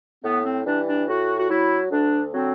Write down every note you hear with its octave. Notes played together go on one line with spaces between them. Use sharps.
A2 B3
C4
E3 G3 D4
D4
A2 F#4
F#4
F#3 E4
D2 D4
D3 F#3 C4